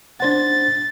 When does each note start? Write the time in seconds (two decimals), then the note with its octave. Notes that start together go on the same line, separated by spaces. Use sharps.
0.20 D4 C5 F#5 A6